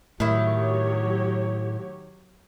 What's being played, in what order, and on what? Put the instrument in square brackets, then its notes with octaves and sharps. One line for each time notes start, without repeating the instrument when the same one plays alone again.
[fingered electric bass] A2 [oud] D#3 E4 [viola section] F#3 G4 C#5